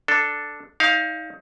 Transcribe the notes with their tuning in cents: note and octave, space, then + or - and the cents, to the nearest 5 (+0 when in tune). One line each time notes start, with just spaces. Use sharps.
D4 +0 A4 +0
D#4 +30 D5 -10 F5 +0